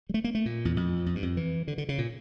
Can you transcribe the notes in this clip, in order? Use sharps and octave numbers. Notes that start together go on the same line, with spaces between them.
G3
A3
A#3
A3
A#2
E2
F2
F2
G2
F2
E3
D3
D3
C#3
A#2